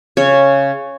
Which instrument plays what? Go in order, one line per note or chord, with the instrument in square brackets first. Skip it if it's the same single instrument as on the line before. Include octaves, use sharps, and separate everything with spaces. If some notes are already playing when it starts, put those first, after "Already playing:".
[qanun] C#3 C#5